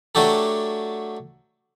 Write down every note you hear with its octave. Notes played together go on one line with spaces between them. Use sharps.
F#3 A3 D4 F#4 G4 A4